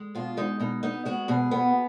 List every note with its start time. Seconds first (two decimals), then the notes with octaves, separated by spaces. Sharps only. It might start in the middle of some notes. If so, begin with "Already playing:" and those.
Already playing: G#3
0.15 B2 F4
0.37 G#3 D#4
0.60 B2 D#4
0.83 B3 D#4
1.05 G#3 F#4
1.28 B2 G#4
1.51 B3